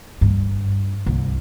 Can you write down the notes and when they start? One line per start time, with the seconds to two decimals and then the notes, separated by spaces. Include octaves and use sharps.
0.21 G2
1.06 C2